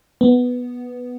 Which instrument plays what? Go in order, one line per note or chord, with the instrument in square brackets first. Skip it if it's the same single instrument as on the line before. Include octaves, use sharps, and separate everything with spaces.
[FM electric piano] B3